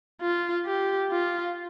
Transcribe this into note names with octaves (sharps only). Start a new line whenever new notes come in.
F4
G4
F4